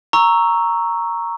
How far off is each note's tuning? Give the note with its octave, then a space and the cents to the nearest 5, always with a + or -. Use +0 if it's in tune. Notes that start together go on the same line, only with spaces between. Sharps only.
A#5 +0 C#6 +0 E6 +0